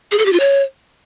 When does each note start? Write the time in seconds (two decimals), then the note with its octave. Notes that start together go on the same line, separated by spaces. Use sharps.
0.12 G#4
0.19 A4
0.26 G4
0.33 F4
0.40 C#5